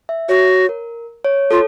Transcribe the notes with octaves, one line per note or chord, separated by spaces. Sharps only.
E5
F#4 C#5
A#4
C#5
F4 A4